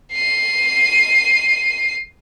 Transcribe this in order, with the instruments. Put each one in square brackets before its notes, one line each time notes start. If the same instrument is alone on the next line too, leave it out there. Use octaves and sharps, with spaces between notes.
[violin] C7 D#7